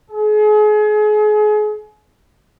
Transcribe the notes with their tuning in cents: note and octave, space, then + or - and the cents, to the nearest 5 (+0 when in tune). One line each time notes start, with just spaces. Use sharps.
G#4 +35